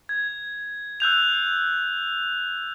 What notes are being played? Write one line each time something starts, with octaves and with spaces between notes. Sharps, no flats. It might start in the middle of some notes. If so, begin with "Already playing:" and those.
G#6
E6 F#6 G6 F7